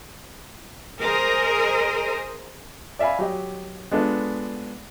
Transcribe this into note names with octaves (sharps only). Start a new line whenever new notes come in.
G#4 A#4 C5 D#5
D5 E5 F5 G#5 B5
F#3 G4 D#5
G#3 B3 D4 F4 A4